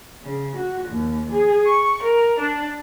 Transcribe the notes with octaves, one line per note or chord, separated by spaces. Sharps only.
C#3
F#4
D#2
G#4
C#6
A#4
D4